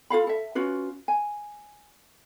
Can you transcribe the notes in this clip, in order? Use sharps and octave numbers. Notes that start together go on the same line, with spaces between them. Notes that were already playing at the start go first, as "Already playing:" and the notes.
F4 A4 F5 B5
A4 E5
C#4 F4 F#4 B4
G#5